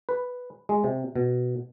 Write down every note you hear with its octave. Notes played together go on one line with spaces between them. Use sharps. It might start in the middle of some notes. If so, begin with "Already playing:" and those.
B4
G#3
C3
B2